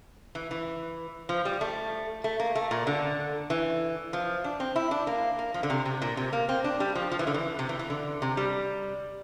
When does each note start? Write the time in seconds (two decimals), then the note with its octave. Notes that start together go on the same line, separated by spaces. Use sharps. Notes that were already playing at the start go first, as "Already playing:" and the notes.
0.35 E3
0.51 E3
1.29 F3
1.45 G3
1.61 A3
2.24 A3
2.40 A#3
2.55 A3
2.71 A#2
2.87 D3
3.50 E3
4.13 F3
4.44 D4
4.60 C4
4.76 E4
4.91 D4
5.07 A#3
5.39 A#3
5.54 F3
5.63 D3
5.70 C3
5.85 C3
6.02 A#2
6.17 C3
6.33 A#3
6.49 C4
6.64 D4
6.80 G3
6.95 F3
7.12 F3
7.19 E3
7.27 D3
7.34 E3
7.59 C3
7.69 E3
7.79 E3
7.90 D3
8.22 C3
8.37 G3